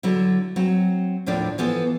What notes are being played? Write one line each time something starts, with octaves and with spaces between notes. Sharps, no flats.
D3 F#3 E4
F#3 C4
D#2 A2 F3 D4 D5
E3 F3 B3 A4